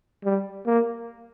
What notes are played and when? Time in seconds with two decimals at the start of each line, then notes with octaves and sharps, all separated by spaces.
0.25 G3
0.66 A#3